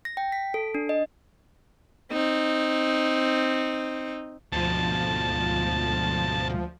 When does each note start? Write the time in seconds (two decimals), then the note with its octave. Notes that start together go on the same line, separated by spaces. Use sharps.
0.05 A#6
0.17 G5
0.32 B6
0.54 A4
0.75 D4
0.89 D#5
2.12 C4 D#4
4.52 D2 G#2 B2 F3 A5